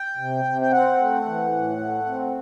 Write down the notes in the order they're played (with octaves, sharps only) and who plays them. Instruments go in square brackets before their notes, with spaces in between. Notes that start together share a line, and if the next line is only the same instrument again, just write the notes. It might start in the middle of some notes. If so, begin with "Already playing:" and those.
Already playing: [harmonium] G5
C3
C3
G5
C4 F#5
A3
E3
A2
A3
C4